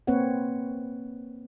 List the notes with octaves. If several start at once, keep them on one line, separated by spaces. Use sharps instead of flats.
A#3 C4 B4 C#5 F#5